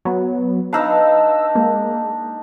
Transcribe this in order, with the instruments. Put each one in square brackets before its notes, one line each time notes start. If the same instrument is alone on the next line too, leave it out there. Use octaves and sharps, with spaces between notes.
[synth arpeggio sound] F#3 B3
[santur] D4 D#4 A5 [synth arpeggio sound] B4 F5 E6
[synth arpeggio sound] G#3 A#3